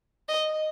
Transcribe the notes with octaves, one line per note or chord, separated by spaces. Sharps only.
D#5